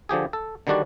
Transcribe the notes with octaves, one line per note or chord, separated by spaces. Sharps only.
D3 F3 G4 G#4
A4
D3 D#3 G3 D4 F#4 D5